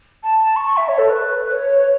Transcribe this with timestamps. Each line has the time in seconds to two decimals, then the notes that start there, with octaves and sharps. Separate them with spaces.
0.23 A5
0.56 C#6
0.66 C#6
0.77 E5
0.88 C#5
0.99 A4
1.10 B4
1.52 C#5